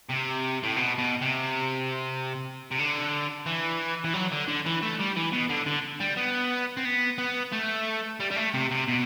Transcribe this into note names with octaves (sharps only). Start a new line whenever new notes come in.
C3
A2
B2
B2
C3
C3
D3
E3
E3
F#3
D3
D3
E3
A3
G3
E3
B2
D3
D3
G3
B3
C4
B3
B3
A3
G3
G3
A3
C3
C3
B2